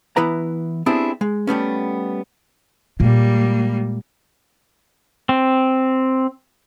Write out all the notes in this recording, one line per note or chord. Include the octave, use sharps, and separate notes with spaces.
E3 B3 E4 B4 A#5
B3 C4 D4 E4 G4 G#4
G#3
G3 A3 B3 C#4
A#2 G3 G#3 A#3
C4